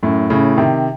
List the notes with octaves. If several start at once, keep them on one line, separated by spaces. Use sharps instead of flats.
F#2 A2
A2 C#3
C3 D#3